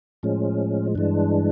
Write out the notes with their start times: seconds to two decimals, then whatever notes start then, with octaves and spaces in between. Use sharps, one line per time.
0.23 A2 F3 G#3 C#4
0.95 G2 E3 G#3 D4